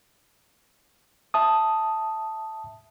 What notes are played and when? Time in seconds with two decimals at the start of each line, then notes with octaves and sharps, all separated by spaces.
1.34 E5 A5 D#6